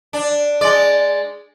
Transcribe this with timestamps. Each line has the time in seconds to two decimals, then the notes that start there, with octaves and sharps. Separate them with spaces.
0.13 D4
0.61 G#3 D5